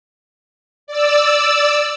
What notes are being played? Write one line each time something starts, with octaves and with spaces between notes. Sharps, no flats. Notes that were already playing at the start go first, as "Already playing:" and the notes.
D5 E6